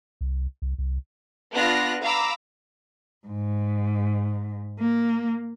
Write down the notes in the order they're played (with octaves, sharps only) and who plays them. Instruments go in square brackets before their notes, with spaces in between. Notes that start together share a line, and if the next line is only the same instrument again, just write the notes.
[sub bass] C2
C2
C2
[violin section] B3 D4 F4 F6 F#6 A#6
F5 A#5 B5 D6 E6
[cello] G#2
A#3